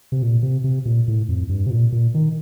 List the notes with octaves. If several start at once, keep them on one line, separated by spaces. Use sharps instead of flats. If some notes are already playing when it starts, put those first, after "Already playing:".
C3
A#2
C3
C3
A#2
A2
F2
G2
C3
A#2
A#2
D#3